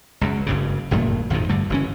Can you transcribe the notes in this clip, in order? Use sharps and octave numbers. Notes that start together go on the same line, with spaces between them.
C#2 F#2
F#1 G2 C#3
G#1 F#2 A#2 A3
G#1 F2 A#2 D#3
G2 D3 A3
F#1 E3 C#4